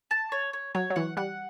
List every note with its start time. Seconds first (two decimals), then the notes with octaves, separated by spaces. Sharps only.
0.11 A5
0.32 C#5
0.53 C#5
0.75 F#3 C#5
0.90 F#3
0.96 E3 F#5
1.17 G3 F#5